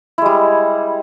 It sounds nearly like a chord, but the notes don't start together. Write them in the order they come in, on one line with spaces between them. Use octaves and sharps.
E4 G#3 G3